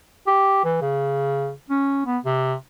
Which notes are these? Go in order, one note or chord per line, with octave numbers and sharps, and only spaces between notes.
G4
E3
C#3
C#4
B3
C3